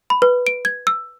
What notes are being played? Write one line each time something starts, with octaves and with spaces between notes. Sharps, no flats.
B5
B4
D7
G#6
E6